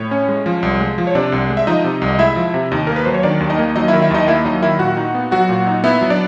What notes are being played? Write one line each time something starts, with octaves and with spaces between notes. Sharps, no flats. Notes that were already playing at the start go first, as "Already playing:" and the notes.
Already playing: A2 C#5
C#4
G#3
F3
C2
G#3
F3
C#5
C3 D4 D5
C2
G#3
E5
F3 D#4 D#5
C3
C2
D#5
G#3 E4 E5
F3
C3
D#2 D#4 D#5
A#3 A#4
B4
F#3 C5
C#5
D#3 D4 D5
D#2
D#4 D#5
A#3
F#3 D#4 D#5
D#3 E4 E5
E4 E5
D#2 D#4 D#5
A#3 E4 E5
F#3 D#4 D#5
D#3 E4 E5
A#2 F#4 F#5
D#4
B3
F#3 F#4 F#5
A#2
D#4
B3 E4 E5
F#3
D4 D5